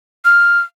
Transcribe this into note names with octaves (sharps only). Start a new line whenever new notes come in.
F6